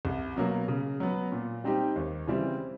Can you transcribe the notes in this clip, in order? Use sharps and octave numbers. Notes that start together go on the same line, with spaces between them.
C2
B2 F#3 A#3
C#3
F#3 B3
A#2
G3 C4 D#4 G4
D#2
C#3 E3 G3 C4